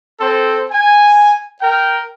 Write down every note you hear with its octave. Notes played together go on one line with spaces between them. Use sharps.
C4 A4 C5
G#5
A#4 G5